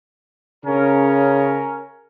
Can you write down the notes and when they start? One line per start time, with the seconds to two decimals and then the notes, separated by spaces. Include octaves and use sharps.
0.66 C#3 C#4 A#4